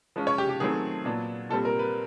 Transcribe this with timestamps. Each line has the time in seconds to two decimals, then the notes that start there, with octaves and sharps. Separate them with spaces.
0.16 F3 G#3 C#4
0.27 C#5
0.38 G4
0.49 G4
0.60 D#3 F#3 A3 C4 G#4
1.05 A#2 F#3 B3 D4
1.50 A#2 G3 C4 A4
1.65 A#4
1.79 B4